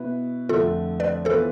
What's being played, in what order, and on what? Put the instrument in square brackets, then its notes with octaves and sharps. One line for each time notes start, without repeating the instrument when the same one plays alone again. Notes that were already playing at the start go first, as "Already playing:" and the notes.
Already playing: [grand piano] B2 B3 E4 B4
[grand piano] F2 D3 A3 [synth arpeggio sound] F4 A4
[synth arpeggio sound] B4 D5
[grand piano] E3 B3 F4 B4 [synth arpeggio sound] A4 C5